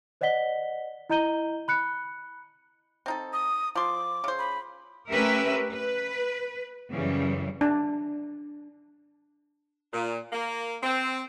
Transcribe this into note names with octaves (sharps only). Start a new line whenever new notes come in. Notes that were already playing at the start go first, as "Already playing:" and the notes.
C5 D5 D#5 F#5 B6 G7
E4 D#5 A#5 G6 D#7 G7
B5 F#6 C#7
C4 D#4 A4
D#6
F3 C6 D6
C#3 C5
B5
A3 C#4 G4 A#4 B4 E5
B4
F#2 C#3 E3 G3
D4
A#2
A#3
C4